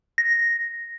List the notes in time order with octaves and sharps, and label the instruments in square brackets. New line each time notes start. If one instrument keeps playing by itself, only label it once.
[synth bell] A#6